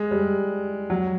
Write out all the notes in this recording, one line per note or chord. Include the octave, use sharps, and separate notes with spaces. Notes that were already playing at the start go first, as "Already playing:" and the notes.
Already playing: G#3
G3
F#3